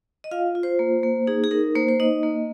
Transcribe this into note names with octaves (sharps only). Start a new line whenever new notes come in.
D#5
F4 F5
F4
C5
A#3
A#3
D#4 G#4
G#4
D#4 A#4
A#3 C5
C5
D#4 D#5
A#3